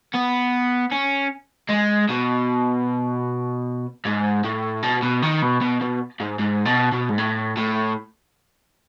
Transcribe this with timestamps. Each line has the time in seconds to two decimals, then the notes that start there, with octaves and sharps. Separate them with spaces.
0.14 B3
0.92 C#4
1.70 G#3
2.09 B2
4.05 G#2
4.44 A2
4.83 B2
5.03 B2
5.22 D#3
5.42 B2
5.61 B2
5.81 B2
6.20 G#2
6.39 G#2
6.66 B2
6.92 B2
7.09 G#2
7.18 A2
7.57 A2